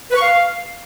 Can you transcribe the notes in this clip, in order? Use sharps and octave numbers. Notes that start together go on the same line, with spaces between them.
B4
C#6
F5